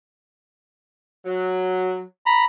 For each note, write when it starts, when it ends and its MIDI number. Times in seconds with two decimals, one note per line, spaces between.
1.25 2.01 54
2.26 2.45 82
2.26 2.45 83